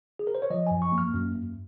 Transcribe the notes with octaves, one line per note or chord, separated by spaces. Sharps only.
G#4
A#4
C5
C#5
F3 D#5
F#2 G#5
C#6
A#3
F6
F#2
F#2